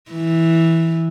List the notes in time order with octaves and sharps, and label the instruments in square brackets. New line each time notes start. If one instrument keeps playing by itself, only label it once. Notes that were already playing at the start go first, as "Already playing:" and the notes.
[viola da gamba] E3